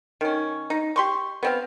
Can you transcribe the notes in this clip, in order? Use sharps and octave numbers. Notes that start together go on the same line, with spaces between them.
D#3 C#4
D#4
G4 C6 C#6
B3 C4 F5